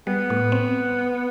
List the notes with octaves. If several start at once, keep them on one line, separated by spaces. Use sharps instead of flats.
G3 B3
A2
C4